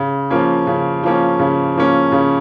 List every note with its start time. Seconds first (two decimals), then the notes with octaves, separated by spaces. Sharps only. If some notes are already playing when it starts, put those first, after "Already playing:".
Already playing: C#3
0.30 F3 A#3 C#4
0.67 C#3
1.03 F3 A#3 C#4
1.39 C#3
1.76 F3 A#3 C#4
2.12 C#3